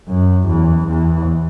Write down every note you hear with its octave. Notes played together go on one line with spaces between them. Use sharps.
F#2
E2
E2